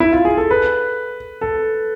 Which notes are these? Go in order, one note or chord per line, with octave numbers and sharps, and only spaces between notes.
E4
F4
G#4
A4
B4
A4